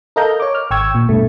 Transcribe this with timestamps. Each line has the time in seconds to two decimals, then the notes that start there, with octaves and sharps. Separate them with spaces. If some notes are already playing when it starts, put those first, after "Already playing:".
0.16 A4 A#4 D#5 F5 A#5 G6
0.40 C#5 D6
0.55 F6
0.71 G#1 G5 C#6 E6 G#6
0.95 A#2
1.09 G2 B2 A3